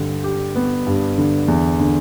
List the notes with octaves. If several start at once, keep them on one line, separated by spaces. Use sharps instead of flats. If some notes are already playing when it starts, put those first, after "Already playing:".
Already playing: G2 D3
G4
B3
G2
D3
E2
D3